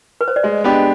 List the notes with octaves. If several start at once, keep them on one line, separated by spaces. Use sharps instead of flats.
B4
C5
D5
G#3 D#5
B3 D4 G4